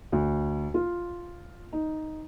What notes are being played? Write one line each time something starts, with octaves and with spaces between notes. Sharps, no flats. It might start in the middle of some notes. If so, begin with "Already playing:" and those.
D2
F4
D#4